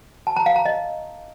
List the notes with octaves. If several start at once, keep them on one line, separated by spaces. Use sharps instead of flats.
A5
A#5
F5
A#5
D#5